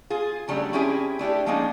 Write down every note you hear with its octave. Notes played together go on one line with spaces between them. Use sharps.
F4 G#4
C#3 F#3 G3 A3 D4
C4 C#4 E4 G4 G#4
A3 D4 E4 G4
F3 G#3 A#3 C#4 D#4 F4